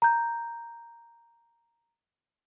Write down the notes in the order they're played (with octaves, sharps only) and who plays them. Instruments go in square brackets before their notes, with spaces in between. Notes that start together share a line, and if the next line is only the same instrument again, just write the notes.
[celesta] A#5 G6